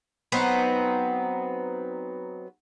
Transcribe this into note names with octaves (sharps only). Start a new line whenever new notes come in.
F#3 B3 C4 D#4